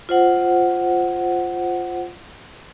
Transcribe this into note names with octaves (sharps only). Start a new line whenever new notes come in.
F4 C5 F#5